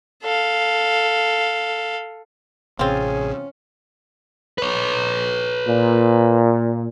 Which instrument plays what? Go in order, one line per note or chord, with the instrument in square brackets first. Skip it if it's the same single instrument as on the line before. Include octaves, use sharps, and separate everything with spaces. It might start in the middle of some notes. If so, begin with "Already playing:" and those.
[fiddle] A4 F5
[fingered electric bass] A1 C3 [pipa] C4 F4 [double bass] C#4 [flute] G#4
[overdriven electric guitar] B4 C#5
[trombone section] A#2